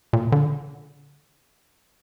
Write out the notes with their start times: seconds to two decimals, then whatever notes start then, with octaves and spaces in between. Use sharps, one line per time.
0.13 A#2
0.32 D3